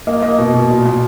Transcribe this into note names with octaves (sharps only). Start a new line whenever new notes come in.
A#3 D#5
A#3 D#5
B2
B2
A#2
A#2